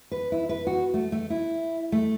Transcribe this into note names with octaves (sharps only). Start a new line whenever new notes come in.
B4
E4
B4
F#4
A3
A3
E4
A3